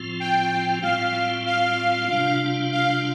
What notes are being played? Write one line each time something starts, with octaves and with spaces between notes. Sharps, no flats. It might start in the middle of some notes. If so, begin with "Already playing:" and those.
Already playing: A2 F3 C4 F4
G5
A2 G3 C4 F4 F5
F5
C3 G3 D4 F4
F5